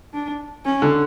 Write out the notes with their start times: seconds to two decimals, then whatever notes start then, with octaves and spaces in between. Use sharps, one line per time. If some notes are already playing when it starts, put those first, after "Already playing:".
0.13 D4
0.65 C#4
0.82 D3